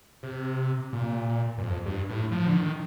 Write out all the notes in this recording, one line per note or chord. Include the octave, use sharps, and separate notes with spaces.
C3
A#2
G2
F2
G2
A2
F3
D3
D#3